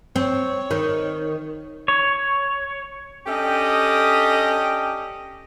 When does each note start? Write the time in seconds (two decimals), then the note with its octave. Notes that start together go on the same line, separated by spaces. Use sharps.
0.16 C4 C#5
0.71 D#3
1.88 C#5
3.27 C#4 D4 G4 A4 D#5 G5